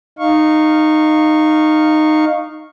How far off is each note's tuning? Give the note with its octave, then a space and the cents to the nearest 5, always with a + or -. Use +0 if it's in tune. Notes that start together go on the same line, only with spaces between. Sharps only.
D#4 -15 F5 +0 C#6 -10